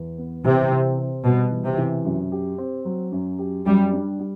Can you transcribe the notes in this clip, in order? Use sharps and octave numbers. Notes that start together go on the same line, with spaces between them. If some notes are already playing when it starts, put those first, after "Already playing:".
Already playing: E2
B3
C3 E3
E3
C4
B2 G3
E3
C3
E3
F#2
G4
C4
F#3
F#2
G4
F#2 G3
D4
G3